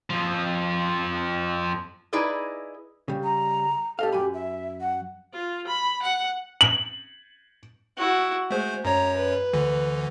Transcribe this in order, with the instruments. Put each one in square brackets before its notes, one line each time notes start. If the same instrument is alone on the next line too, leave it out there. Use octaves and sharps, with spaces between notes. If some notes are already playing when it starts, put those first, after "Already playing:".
[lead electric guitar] F2 F3
[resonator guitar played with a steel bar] D#4 E4 G#4 B4 D5 D#5
[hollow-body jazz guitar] C#3 G3
[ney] A#5
[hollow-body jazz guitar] G4 D#5 F5 [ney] A4
[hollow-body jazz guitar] F#2 G#5 B5 [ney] G4
[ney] E5
F#5
[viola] F4
B5
F#5
[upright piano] F#7
[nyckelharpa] E4 F#4
[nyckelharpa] G#3 [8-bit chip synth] A3 C5
[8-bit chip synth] F#2 C#5 [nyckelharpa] A#5
[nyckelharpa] B4
[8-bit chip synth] D2 D3 E3